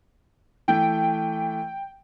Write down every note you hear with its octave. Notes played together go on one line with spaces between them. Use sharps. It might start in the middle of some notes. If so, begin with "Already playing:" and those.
E3 A3 G5